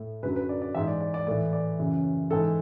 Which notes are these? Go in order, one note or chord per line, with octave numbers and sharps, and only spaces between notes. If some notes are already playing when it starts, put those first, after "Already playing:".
Already playing: A2
F#2 D3 F#3 B4
B4
D5
D5
G#2 E3 E5
D5
D5
D5
A2 E3 D5
D5
F#2 C#3 E3
G#2 E3 A4